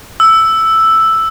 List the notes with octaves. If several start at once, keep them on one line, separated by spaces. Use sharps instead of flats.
E6